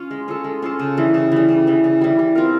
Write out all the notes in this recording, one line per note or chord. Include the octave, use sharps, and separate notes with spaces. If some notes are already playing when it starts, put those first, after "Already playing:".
Already playing: C#4 F4
G#3
C#4 F4 A4
G#3
C#4 F4 A4
C#3
E3 G3
C#3
E3 G3
C#3
E3 G3
C#3
E3 G3
G3
C4 F4 A#4